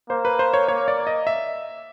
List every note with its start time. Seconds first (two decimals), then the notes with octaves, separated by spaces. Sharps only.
0.09 A#3 C5
0.25 B4
0.39 C5
0.54 C#5
0.68 A#3 C#5
0.88 D5
1.07 D#5
1.27 E5